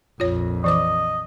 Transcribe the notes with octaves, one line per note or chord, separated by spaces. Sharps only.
A#1 F2 F4 C#5
E3 C5 D#5 D6